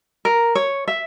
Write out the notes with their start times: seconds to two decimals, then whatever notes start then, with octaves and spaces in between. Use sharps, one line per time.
0.25 A#4
0.55 C#5
0.88 E5